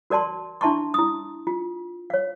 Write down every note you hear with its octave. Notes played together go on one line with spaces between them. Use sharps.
F#4 A#4 D5 A5 C6
D4 E4 E5 A5 C6 C#6
E4 D#6
F4
C#5 F5